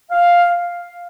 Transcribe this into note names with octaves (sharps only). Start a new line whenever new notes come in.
F5